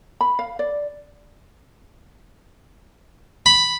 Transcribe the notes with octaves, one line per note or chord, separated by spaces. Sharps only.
B5
F5
D5
B5